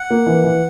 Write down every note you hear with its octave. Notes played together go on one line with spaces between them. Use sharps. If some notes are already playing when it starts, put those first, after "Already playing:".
Already playing: F#5
A#3
E3
E3